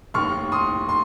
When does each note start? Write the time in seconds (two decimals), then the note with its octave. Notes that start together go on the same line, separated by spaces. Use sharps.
0.14 F1 D#2 D#3 C#6 F6
0.52 C6 D#6
0.89 C6